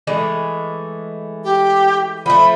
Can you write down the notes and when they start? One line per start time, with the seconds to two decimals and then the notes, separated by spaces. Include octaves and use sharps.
0.07 E3 G#3 A3
1.44 G4
2.26 F3 A3 B5